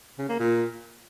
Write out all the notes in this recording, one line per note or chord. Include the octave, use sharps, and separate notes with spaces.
C#3
A#3
A#2